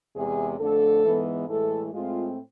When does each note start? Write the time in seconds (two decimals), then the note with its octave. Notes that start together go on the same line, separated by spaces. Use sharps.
0.15 E2 C3 G#3 G#4
0.59 F2 D3 A3 A4
1.04 G#2 E3 G#3 B3
1.48 A2 E3 G#3 A4
1.93 A2 G#3 C4 F4